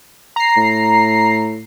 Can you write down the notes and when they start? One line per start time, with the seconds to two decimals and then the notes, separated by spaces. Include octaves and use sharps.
0.36 A#5 C7
0.57 A2